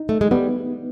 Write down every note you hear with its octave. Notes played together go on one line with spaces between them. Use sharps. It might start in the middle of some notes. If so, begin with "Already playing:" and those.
Already playing: D#4
A3
G#3
G3 B3